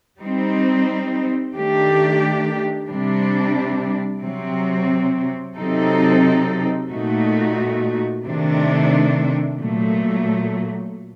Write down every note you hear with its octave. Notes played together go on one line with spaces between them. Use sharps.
G3 C4 D#4
D#3 A3 D4 G4
C3 G3 D4
C3 F#3 C4
C3 F#3 C4 D#4 A4
A#2 A3 D#4 F#4
C3 D#3 A3 D4
A#2 F#3 A3